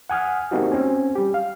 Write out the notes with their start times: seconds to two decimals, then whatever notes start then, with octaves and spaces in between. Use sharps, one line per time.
0.09 F#5 G#5 D#6 F6
0.51 A3 A#3 C4 D#4 F#4 G4
0.72 C4 C#4 G#5
1.15 G3 G4
1.34 F5